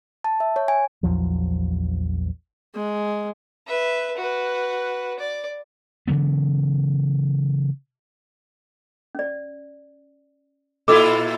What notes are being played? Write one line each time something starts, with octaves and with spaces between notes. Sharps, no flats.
A5
E5
C#5
G#5
A#1 E2 F3 F#3
G#3
B4 E5
F#4 B4
D5
C#3 E3 F#3 B3
C#4 D5
A#2 E4 F4 A4 D6